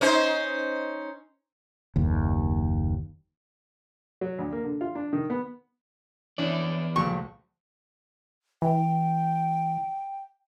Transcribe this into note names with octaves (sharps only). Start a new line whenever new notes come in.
C#4 D#4 C5
F#1 D#2
F#3
D2
A#3
D3
F4
D4
D#3
B3
E2 E3 C#4 D4 E4 D5
C#2 A#2 F3 F#3 A3 C#6
E3 G5